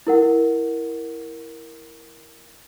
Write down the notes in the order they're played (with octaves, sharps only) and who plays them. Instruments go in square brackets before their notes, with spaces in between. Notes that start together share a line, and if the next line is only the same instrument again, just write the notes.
[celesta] E4 A#4 F#5